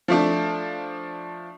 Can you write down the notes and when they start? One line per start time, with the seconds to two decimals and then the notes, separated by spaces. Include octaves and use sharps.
0.08 F3 A3 D4